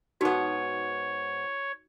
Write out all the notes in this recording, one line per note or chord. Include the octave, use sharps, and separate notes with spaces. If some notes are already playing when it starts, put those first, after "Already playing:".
G#2 B3 D#4 F#4 C#5